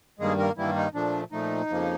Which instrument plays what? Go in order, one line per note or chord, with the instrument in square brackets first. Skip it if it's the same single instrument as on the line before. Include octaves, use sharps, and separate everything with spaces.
[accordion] G2 D#3 G3 G#3 A#3 G#4
A#3 A#4
G2 D#3 E3 G3 A#3 E4
D#4
A#2 F3 A3 D4
A#2 F3 A3 D#4
F2 C#3 F3 A#3